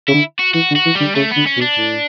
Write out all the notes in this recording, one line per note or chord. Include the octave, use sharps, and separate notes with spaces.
C#3 E4
D3
F#4
E3 F#4
D3
F#4
E3
D3 G3
C#3 A3
D3 B3
C#4
B2
D4
A2